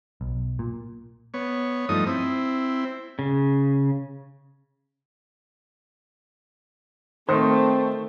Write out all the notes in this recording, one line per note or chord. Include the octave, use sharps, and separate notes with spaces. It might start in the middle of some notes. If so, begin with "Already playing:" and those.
B1
A#2
B3 C#5
G2 F3 A3 D#4 D#6
C4 E4
C#3
D#3 A3 C4 C5